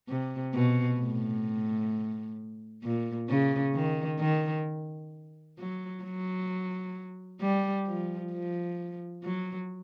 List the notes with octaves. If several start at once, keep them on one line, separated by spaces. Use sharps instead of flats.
C3
B2
A2
A#2
C#3
D#3
D#3
F#3
F#3
G3
F3
F3
F#3